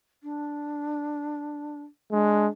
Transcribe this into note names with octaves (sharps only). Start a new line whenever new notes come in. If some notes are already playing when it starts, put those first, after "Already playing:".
D4
G#3 D4